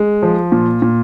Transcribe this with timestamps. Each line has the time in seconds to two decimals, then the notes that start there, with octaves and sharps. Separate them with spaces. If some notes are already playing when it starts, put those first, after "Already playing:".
Already playing: G#3
0.23 F3
0.52 A#2
0.82 A#2